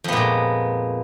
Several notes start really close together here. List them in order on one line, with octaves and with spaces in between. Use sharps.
F2 B3 A#2 G#3